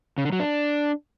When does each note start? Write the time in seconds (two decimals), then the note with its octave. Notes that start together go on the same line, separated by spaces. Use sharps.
0.18 C#3
0.25 D3
0.32 F#3
0.40 D4